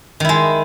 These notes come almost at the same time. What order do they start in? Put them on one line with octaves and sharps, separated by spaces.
D#3 E4 G#3